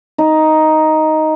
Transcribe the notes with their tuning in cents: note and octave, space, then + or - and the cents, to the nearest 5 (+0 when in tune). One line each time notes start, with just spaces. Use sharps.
D#4 +5